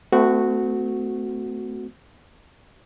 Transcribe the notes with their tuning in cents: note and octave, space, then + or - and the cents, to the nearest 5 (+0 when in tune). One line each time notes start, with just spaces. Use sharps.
A3 +5 C4 -40 F#4 -5